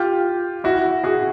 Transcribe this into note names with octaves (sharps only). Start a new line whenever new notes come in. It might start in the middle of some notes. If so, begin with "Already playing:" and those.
Already playing: F4 G4
E4 F#4
F#4 G#4